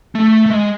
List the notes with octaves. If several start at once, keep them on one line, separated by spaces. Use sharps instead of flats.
A3
A3
G#3